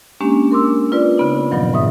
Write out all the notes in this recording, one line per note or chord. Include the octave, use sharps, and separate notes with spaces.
G#3 A#3 C#4 D4 G4
A#4 C6 D6 E6
F4 B4 D5
C#3 B3 D#4
G2 A#2 D#3 F3 F#3
G#2 E5 D#6